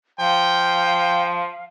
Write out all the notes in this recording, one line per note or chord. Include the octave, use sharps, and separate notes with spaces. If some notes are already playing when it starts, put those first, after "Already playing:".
F3 F5 G5